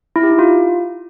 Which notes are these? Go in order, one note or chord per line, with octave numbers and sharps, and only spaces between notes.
E4
G4
D#4
F4